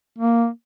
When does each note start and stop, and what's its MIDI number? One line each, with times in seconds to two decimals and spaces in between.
0.18 0.48 58